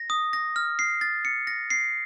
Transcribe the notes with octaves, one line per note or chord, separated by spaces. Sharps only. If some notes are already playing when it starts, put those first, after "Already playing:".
Already playing: A#6
D#6
A#6
F6
C7
A6
C#7
A#6
C7